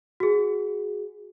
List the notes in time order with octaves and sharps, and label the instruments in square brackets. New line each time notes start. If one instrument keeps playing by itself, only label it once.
[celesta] F#4 G#4